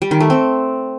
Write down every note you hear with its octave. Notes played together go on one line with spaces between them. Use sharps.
G3
D#3
A3
C4